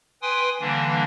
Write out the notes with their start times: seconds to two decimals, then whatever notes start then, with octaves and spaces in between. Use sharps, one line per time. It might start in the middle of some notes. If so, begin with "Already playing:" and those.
0.22 B4 G5 G#5 C6 D#6
0.60 D3 E3 G3 A#3 D4